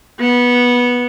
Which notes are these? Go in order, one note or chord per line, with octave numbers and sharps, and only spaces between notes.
B3